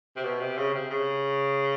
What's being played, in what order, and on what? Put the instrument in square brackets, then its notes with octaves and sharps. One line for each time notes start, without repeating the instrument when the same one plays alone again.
[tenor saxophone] C3
B2
C3
C#3
C3
C#3